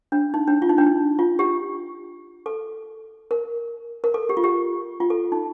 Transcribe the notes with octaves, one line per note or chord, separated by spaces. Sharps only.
D4
D#4
D4
F4
D#4
D4
D#4
F4
G4
A4
A#4
A#4
A4
G4
F4
G4
F4
A4
D#4